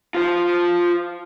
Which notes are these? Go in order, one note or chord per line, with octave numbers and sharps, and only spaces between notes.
F4 C5